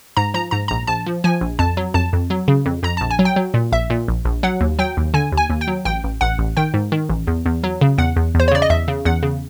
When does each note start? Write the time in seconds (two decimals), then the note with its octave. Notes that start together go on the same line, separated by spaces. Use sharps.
0.17 G#2 A#5
0.34 F3 A#5
0.51 G#2 A#5
0.68 A#1 A#5
0.87 A#1 A5
1.06 F3
1.24 F3 G#5
1.41 A#1
1.59 F2 A5
1.77 F#3
1.94 F2 A5
2.13 F2
2.30 F#3
2.48 C#3
2.66 F2
2.83 F2 A#5
2.97 A#1 A5
3.11 G#5
3.19 F#3
3.25 G5
3.36 F#3
3.54 A#2
3.72 A#1 E5
3.90 A#2
4.08 A#1
4.25 A#1
4.43 F#3 F#5
4.61 D#2
4.79 F#3 G5
4.97 D#2
5.14 D3 G#5
5.32 D#2
5.37 G#5
5.50 D#2
5.61 G5
5.68 F#3
5.85 A1 G5
6.04 A1
6.21 A1 F#5
6.39 A1
6.57 D#3 G5
6.74 G#2
6.92 D#3
7.09 A1
7.27 E2
7.46 E2
7.64 F#3
7.81 C#3
7.98 E2 F#5
8.16 E2
8.35 E2 C5
8.48 C#5
8.51 C#3 D5
8.62 D#5
8.70 E2 E5
8.88 C#3
9.05 E2 F#5
9.23 C#3